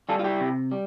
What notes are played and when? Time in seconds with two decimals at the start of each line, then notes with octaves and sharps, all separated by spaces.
0.09 G3 F4 A4
0.19 F4
0.24 E4 G4
0.41 C3
0.71 G3